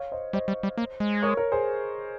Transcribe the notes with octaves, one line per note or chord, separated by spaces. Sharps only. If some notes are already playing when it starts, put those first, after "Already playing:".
Already playing: C#5 F5
C5 D#5
G3 C5 D#5
G3
G3
A#3
G#3
A#4 C#5
A#4 C#5
G#4 C5